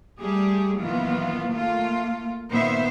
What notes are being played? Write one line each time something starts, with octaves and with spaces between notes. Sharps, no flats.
G3 A3 G4 G#4
F#2 A#2 D#3 E3 B3 F4
A3 A#3 F4
A#2 D#3 B3 C5 E5